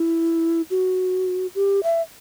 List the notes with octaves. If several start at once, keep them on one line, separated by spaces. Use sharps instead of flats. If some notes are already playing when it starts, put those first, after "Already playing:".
Already playing: E4
F#4
G4
E5